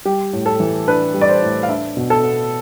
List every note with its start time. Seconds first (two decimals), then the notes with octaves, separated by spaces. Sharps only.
0.05 G3 G4
0.33 A2
0.46 A4
0.60 E3
0.88 D4 B4
1.14 G3
1.21 D5
1.29 C5
1.42 A2
1.63 F5
1.69 D4 E5
1.97 B2
2.10 A4
2.24 B3